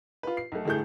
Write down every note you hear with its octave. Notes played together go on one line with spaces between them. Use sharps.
F4 B4
C7
B1 A3
G1 A2 A3 G#4 G6